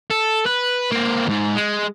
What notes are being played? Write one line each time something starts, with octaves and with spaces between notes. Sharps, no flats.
A4
B4
A#3 C4
E2 G#2
G#3